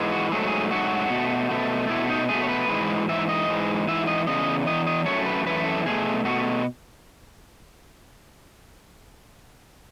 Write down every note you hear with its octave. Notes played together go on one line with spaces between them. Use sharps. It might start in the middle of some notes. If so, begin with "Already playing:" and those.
Already playing: G#2 E3 G#3
F#4
G#2 F#3 A3 G#4
A4
G#4
G#2 F#3 A3 F#4
B2 A3
B2 A3
B2 A3 E4
D#4
B2 A3 G#4
C#5
B4
G#2 E3 G#3
G#2 E3 E5
D#5
G#2 E3 G#3
G#2 E3 E5
D#5
E2 C#3 D#5
E2 C#3 E3 D#5
D#5
F#2 E3 A3 C#5
B4
F#2 E3 A3 B4
A4
B2 A3 G#4
B2 A3 F#4